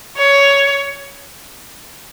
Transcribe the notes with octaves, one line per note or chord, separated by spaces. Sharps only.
C#5